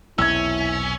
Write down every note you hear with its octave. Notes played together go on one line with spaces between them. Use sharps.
B1 E2 C3 C#4 E4 E6 G#6